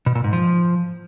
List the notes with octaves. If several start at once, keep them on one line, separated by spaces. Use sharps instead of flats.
B2
A#2
G#2
F3